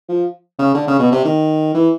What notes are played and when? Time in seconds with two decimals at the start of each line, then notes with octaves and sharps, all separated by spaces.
0.09 F3
0.59 C#3
0.74 D3
0.87 C#3
0.99 B2
1.12 C3
1.25 D#3
1.74 E3